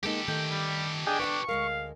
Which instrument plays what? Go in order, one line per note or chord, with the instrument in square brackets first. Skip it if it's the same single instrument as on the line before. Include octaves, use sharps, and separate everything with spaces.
[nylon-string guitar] G#3 A#3 D#4 [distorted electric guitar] G4 A4
[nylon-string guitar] D#3 A3 [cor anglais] G5
[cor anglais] G3
[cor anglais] D4 [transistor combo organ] G#4 D#5 G5
[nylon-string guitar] B4 F#5 G5 [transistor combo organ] C#6
[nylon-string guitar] D2 G#3 A#4 [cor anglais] F5